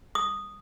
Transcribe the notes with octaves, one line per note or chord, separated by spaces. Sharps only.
D#6